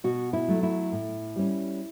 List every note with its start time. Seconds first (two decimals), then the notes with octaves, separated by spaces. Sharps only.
0.04 B2 F#4
0.33 E4
0.48 F#3 A3
0.63 E4
0.92 A2
1.36 G3 C#4